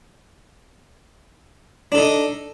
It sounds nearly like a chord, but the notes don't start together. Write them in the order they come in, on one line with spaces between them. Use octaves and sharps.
D4 A4 D#4